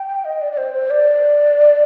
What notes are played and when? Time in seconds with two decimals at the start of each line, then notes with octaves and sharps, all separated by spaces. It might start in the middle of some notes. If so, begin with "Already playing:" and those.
Already playing: G5
0.25 D#5
0.41 D5
0.52 D5
0.57 C5
0.74 C5
0.91 D5